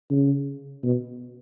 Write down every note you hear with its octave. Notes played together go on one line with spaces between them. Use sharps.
C#3
B2